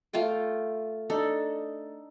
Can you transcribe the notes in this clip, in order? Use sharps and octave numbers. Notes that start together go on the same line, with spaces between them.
A3 F4 F5 G5
D4 D#4 A4